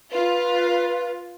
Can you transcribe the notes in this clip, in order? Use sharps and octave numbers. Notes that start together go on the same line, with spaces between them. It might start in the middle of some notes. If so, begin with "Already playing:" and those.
F4 B4